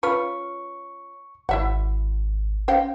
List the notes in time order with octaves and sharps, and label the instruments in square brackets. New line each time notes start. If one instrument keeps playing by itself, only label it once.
[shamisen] C#4 F4 B4 [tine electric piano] C#6
[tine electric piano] G#1 [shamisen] E4 E5 F#5
[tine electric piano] C#4 [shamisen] C5 F5 G5